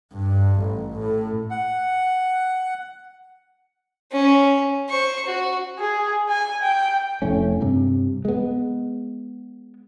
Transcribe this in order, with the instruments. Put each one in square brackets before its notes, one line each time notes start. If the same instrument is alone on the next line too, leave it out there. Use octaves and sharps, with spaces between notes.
[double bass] G2
A1
A2
[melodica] F#5
[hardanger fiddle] C#4
C5 C#6
F#4
[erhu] G#4
G#5
G5
[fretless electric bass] F1 A2 C#4
G2 C3
G#3 B3